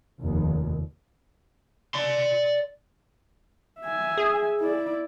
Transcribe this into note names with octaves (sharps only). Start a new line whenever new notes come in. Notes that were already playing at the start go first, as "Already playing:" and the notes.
F1 D#2
D5 C6
E5 G#5
G#4
E4 D5